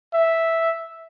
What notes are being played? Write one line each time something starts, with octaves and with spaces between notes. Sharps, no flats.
E5